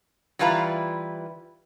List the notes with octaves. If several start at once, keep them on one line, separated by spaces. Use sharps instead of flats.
E3 G3 E4 F4 B4 A#5